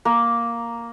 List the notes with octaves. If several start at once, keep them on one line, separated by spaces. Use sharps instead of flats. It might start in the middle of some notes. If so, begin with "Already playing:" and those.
A#3